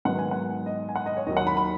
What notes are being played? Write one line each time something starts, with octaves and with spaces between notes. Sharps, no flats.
G#2 D#3 F#3 B3 F#5
G#5
F#5
D#5
G#5
F#5
D#5
C#5
D#2 D#3 F#3 D#5
F#5
B5
B5